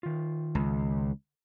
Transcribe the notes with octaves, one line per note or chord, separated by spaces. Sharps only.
D#3 F4
C#2